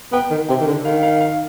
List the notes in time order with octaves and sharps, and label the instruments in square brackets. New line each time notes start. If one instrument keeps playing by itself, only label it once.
[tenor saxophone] B3 [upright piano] G5
[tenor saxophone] D#3
[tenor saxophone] C3 [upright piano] G5
[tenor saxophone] D#3
D3
[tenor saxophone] D#3 [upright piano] F5
[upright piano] F5
F5